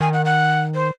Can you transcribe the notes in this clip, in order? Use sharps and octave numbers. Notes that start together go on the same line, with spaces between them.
D#3 G#5
F#5
F#5
C5